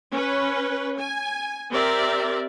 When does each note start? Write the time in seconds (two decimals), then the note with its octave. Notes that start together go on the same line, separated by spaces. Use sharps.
0.12 C#4 B4
0.99 G#5
1.71 C4 G4 A#4 D5 E5